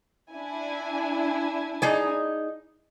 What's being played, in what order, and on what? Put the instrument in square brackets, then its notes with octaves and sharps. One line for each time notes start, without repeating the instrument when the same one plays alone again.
[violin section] D4 E4 G#5
[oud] D#4 G#4 D5